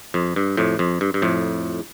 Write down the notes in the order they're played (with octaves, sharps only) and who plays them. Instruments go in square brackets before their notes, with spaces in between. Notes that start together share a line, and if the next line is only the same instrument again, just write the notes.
[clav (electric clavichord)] F2
G2
F2 A2
F2
G2
G2
F2 A2